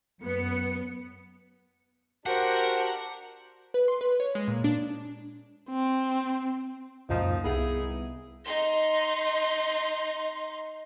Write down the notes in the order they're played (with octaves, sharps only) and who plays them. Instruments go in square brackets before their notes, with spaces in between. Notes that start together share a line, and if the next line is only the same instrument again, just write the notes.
[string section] F#2 B3 C#7
[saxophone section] D4 G4 C5 [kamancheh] F#4 A#4 [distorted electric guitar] F#5
[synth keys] B4
C6
B4
C#5
G#3
A#2
D4
[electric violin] C4
[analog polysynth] C#2 F#2 A#2 [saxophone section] F3 D#4
[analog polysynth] C2 B3 [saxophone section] D#4 E4 G#4
[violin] D#4 C6